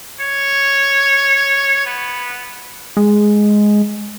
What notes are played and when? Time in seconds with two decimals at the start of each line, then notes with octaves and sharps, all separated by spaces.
0.21 C#5
1.86 B3
2.97 G#3